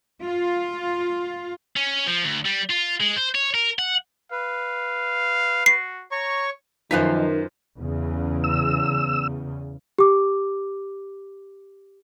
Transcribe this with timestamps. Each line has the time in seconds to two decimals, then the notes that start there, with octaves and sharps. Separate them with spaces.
0.22 F4
1.77 C#4
2.07 F3
2.24 D2
2.45 G3
2.70 F4
3.01 G#3
3.17 C5
3.35 C#5
3.55 A#4
3.79 F#5
4.32 B4 F5
5.66 F#4 C7
6.12 C#5 A#5 C#6
6.91 F#2 D#3 F3 D#4 F4 B4 C5 B6
7.79 E2 C#3
8.44 E6
9.98 G4 D6